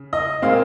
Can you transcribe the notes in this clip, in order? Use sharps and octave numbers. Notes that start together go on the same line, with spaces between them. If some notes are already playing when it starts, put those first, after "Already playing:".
Already playing: C#3
D#5
A#2 G#3 C4 F5